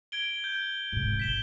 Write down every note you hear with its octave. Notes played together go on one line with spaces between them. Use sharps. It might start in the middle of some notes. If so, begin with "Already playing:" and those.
G#6 D7 G7
G6
G#2 C3
G#1 B6 E7 G7